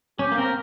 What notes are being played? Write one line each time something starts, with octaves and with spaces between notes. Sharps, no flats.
C#4 G4
A#3
C4 A#4